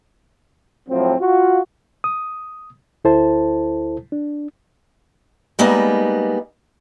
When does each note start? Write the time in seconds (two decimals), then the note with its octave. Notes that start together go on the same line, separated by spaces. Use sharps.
0.89 A2 F3 F#3 C4
1.20 F4 F#4
2.04 D#6
3.04 D2 E4 A4 C5 A5
4.12 D4
5.59 G3 G#3 A#3 B3 D#4